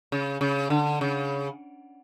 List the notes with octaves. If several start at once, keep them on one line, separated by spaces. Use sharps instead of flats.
C#3
C#3
D3
C#3